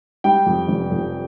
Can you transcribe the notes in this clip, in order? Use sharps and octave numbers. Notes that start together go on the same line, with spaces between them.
G3 G5
F2
F1
F2